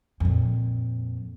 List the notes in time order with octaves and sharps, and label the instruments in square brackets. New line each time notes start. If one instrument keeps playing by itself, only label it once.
[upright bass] F2 A#2